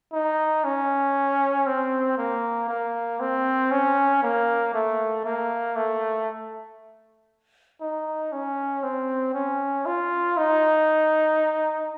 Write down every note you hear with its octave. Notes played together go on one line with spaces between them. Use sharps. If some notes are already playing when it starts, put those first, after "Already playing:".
D#4
C#4
C4
A#3
A#3
C4
C#4
A#3
A3
A#3
A3
D#4
C#4
C4
C#4
F4
D#4